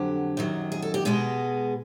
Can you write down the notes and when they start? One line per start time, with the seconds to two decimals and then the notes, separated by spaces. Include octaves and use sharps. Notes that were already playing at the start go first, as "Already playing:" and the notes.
Already playing: F2 D3 F#3 G4
0.37 F#2 D#3 F#3
0.72 G#4
0.82 A4
0.94 G4
1.05 B2 G#3 B3 G#4